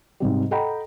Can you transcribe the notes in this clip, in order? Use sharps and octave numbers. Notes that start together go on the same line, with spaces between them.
G#2 C3 G3
A4 D#5 F#5 G5 A#5 B5